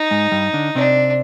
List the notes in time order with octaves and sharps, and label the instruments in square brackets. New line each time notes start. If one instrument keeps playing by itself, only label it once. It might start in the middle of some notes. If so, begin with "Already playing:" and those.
Already playing: [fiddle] D#4
[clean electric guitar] G#2 G#3
G2 G3
D3 D4
[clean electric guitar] C3 C4 [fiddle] D4